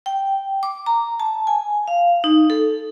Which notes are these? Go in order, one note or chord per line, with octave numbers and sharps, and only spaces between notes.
G5
D6
A#5
A5
G#5
F5
D#4
A4